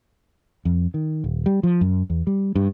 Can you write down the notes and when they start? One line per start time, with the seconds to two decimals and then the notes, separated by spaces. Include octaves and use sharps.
0.65 F2
0.94 D#3
1.24 D#1
1.46 G3
1.63 F3
1.81 F#2
2.10 E2
2.27 G3
2.55 G2